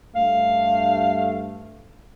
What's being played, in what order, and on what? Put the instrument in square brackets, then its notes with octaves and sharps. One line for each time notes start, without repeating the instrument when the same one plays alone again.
[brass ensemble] G2 A3 [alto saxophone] F5